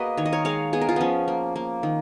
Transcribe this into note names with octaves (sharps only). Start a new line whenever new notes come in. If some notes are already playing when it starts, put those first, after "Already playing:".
Already playing: A#3 B3 F#4 G#4 B4 D#5
D#3 C#5
D#5
A#4 C#5
G#3 C#5 F5
B3 G#4
A#4
F4 G#4
F3 B3 C#4
A#3
A#3
D#3